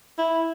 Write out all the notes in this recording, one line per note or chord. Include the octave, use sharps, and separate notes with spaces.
E4